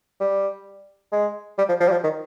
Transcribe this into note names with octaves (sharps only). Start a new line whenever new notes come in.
G3
G#3
G3
F3
F3
G3
F3
D#3